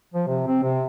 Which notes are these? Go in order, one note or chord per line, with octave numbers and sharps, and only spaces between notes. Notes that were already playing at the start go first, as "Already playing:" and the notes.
F3
C3
C4
C3